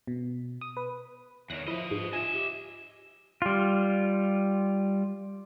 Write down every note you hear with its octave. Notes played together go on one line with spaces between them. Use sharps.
B2
D#6
B4
E2 D#3 C#5 F#6 A#6
F3 E4 B4 D#5
G#2
F4 D#5 E5 G#5
G4
G3 F4